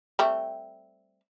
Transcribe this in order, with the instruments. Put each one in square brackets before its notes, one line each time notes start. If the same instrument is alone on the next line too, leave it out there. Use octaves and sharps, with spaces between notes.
[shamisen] G3 A3 C4